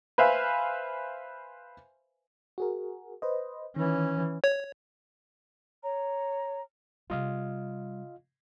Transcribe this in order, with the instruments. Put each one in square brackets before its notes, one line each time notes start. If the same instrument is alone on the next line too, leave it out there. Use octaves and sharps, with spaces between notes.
[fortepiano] B4 C5 E5 F5 G#5
[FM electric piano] F#4 G#4 A#4
B4 C5 D#5
[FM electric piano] D#3 [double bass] E3 C#4
[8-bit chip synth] C#5
[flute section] C#5 A#5
[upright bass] C3 G3 [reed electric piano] F4 D#5 F5